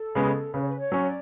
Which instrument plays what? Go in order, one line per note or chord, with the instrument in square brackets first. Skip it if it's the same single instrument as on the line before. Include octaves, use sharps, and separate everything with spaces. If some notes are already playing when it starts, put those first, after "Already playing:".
Already playing: [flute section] A4
[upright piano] C#3 G#3 B3
[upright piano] C#3 [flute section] B4
[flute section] C#5
B4
C#5
[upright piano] F#3 C#4
[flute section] D5